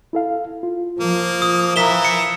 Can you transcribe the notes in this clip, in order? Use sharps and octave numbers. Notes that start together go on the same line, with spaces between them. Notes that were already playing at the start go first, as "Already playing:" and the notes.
E4 A4 F5
F4
F3 A#3
D#6
E3 E4 A#4 F5 A#5 B6 E7 G7
C#7